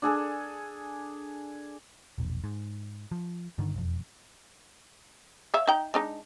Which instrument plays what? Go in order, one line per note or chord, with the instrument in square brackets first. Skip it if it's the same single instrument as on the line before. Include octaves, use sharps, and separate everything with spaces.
[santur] D4 G#4 A4 G#5
[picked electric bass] E1 A#1
G#2
F3
G2 D3 D#3
E1 F2
[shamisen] C#5 E5 F5
D#4 G5 A#5
G#3 D4 D#4